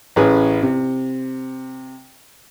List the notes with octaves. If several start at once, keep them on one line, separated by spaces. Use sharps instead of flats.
A1 C#4 G#4 B4
C3